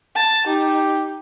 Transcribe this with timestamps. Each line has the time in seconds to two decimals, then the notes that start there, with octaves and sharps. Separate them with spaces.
0.15 A5
0.47 D#4 G4